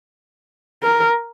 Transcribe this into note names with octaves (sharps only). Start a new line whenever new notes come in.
A#4